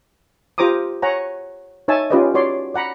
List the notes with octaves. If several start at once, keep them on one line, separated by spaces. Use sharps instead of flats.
F4 G4 C5 A#5 D6 D#6
C#5 F#5 G#5 A#5
D#4 C#5 E5 G#5 A5
C#4 F4 G4 B4 D5 D#5
F#4 C#5 D5 C6
D5 F#5 A#5 B5